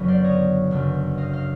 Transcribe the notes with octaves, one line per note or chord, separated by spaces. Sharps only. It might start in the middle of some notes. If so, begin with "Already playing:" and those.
Already playing: F#1 F#2 D3 F#3 B3
C5 D5
C#5 D#5
G1 F#2 C#3 F#3
D#5 F5
D#5 F5